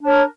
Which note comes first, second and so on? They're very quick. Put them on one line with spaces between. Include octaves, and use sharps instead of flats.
D4 C#5 A#4